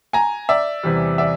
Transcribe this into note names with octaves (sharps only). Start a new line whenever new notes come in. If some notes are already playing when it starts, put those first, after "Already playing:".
G#5 A#5
D5 E5
E2 C3 E3 G3
D5 E5